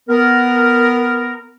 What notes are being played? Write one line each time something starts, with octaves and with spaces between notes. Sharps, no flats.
B3 A#4